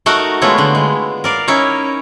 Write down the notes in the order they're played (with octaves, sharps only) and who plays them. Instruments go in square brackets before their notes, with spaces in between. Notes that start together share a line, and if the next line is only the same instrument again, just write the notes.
[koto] A3 D#4 F#4 A#4 F#5
G#3 A3 B3 E4 F4 C#5
D3 B3
G#3
A#4 D5 F5
C#4 D#4 E4 C#5